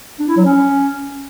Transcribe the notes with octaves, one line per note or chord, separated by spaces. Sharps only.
D4
E4
F#3
C#4